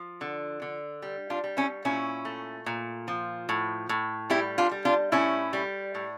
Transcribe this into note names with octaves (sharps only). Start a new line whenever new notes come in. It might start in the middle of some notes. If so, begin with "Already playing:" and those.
Already playing: F3
D3
D3
G3
D4 F4
G3
C#4 E4
A#2 C#4 E4
A3
A#2
F3
A2
A2
G3 E4 G4
D4 F4
G3
D4 F4
A2 C#4 E4
G3
A2